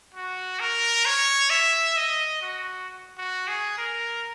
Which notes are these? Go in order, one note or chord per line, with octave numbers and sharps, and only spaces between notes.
F#4
A#4
C#5
E5
D#5
F#4
F#4
G#4
A#4